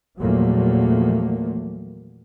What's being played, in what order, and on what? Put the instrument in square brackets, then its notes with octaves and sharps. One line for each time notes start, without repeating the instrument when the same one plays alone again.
[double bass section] E2 A#2 F3 F#3 A3 A#3